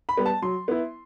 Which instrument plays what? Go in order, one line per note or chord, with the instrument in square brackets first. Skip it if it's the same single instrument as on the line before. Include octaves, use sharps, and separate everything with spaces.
[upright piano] B5
G3 B3
A5
F#3 C6
B3 E4